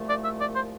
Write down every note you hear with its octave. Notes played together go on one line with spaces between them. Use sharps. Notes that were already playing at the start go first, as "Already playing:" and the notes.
Already playing: C2 A#2 F3 A3
D5
E5
D5
C5